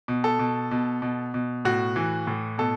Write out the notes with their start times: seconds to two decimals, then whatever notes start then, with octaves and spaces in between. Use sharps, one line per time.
0.08 B2
0.24 A4
0.39 B2
0.71 B2
1.02 B2
1.34 B2
1.65 A2 F#4
1.96 E3
2.27 A2
2.58 B2 A4